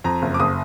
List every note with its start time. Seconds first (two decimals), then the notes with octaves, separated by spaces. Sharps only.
0.04 F2 A#5
0.22 F#1
0.34 D6
0.39 F#1 D#6